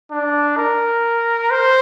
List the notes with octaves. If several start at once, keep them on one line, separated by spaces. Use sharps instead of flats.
D4
A#4
C5